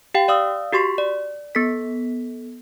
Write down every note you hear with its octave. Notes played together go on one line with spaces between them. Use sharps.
G4 F5 G5
D5 F5 D#6 E6
F#4 G4 C6 C#6 B6
D5
B3 A4 B6